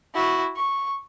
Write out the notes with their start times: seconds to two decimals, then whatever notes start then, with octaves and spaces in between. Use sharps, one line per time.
0.14 E4 F#4
0.57 C#6